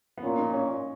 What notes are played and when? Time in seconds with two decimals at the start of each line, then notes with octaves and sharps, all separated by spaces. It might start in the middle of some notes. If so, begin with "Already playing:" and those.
0.17 B3
0.23 A#2 C#4
0.38 D#4
0.53 C#4